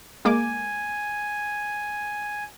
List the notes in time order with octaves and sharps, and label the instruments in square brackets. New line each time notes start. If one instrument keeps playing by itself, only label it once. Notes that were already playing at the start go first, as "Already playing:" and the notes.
[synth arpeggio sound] G#3 A#3 D6 [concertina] G#5